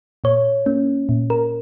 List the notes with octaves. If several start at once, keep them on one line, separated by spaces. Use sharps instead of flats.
A#2 C#5
A#3 C#4
A#2
A#4